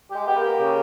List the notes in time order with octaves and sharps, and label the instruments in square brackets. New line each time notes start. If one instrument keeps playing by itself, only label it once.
[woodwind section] G4
[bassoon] G#3
[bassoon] B3 [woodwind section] G4
[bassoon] A#3
[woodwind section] G4
C#3